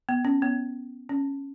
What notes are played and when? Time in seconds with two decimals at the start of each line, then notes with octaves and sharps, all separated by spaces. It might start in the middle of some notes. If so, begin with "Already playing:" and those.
0.09 B3
0.25 C#4
0.42 B3
1.09 C#4